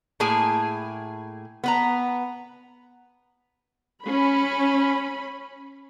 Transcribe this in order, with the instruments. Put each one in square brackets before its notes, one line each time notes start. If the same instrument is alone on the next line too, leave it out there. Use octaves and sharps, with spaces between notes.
[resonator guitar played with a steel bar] A2 A#3 E4 G#4 G#5
B3 B4 A#5
[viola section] C#4 B5